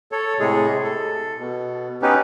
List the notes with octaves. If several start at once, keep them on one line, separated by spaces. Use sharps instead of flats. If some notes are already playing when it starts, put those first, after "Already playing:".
A4 C#5
A2 C3 G#3 G#4
A4
B2
B3 C#4 D#4 G4 B4